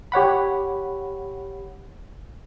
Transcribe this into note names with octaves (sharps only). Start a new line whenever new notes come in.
G4 C#5 F#5 B5